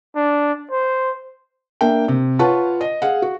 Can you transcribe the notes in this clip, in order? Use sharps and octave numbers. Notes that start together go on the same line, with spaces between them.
D4
C5
A#3 D4 E5 G5
C3
F4 B4 C#5 F#5 A5 C#6
D#5
G#4 F5 F#5
F#4